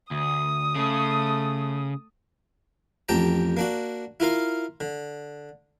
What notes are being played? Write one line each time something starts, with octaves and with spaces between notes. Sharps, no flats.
D2 D#6
C#3 A3
A1 F2 G4 G5 A5 A#5
A#3 D4 F#4
E4 F4 A#4 F5
D3